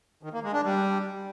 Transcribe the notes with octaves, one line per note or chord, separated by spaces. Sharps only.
D#3
A#3
G#3
D4
G3